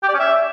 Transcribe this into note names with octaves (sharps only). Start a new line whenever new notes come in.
G4
D5
C#4
E5